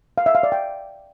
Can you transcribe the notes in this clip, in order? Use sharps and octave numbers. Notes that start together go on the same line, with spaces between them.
F5
E5
F5
D5
G5